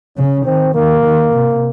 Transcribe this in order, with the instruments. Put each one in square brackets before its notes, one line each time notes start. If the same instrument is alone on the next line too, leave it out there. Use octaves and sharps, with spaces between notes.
[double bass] C#3 [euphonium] C#4
[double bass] D#3 [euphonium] C4
[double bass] D#3 [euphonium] A#3
[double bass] D#3
C3